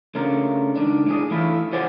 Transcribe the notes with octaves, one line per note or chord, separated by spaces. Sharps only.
C#3 A3 D4 F4 A#4
C#2 G2 D#3 D4
A2 D4 G#4
E3 A3 E4 F4
F4 G4 C5 D5 F#5 G#5